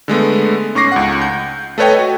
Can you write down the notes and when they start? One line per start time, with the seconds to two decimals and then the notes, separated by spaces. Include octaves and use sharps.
0.08 D3 G#3 A3 B3
0.75 G#2 C#4 C#6 D6 A#6 C7
0.92 C#2 F#5
1.22 G6
1.78 A3 A4 B4 C#5 D#5 G5
1.99 F#4